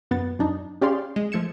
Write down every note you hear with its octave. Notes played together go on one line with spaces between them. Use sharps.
F#2 B3 F#5 A6
F#2 D4 D#4
C#4 G4 G#4 D5 F5 C6
G#3
F3 A3 G#6 C#7 E7